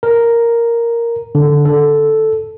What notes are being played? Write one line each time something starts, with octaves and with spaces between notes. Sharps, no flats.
A#4
D3
A4